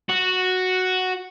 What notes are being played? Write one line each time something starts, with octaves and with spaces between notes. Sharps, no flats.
F#4